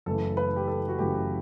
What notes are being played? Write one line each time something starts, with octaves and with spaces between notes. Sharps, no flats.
F#1 F#2 E3 A3 A4
B4
G4
A4
F#4
F#1 F#2 E3 A3 G4